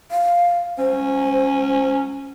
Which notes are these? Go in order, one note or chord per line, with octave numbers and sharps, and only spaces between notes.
F5
C#4 C5